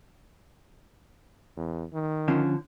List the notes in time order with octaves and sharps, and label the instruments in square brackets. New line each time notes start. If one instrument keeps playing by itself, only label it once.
[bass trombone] E2
D#3
[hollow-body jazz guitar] D3 F3 C#4